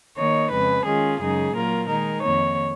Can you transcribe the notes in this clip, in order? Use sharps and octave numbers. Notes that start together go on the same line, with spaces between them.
D#3 A#3 D#4 C#5
F2 C#3 G#3 B4
D#3 G#3 C#4 F4 G#4
F#2 C#3 G#3 D#4 G#4
A#2 F#3 A#3 F4 A#4
D#3 G#3 D#4 A#4
F2 D#3 A#3 C#5